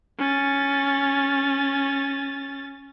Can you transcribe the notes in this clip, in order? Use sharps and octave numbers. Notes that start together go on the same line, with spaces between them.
C#4 A6